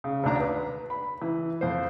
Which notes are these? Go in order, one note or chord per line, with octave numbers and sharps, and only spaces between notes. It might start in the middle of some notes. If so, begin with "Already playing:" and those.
C#3
G#1 D2 D4 A#5
B4
B5
E3
F2 C5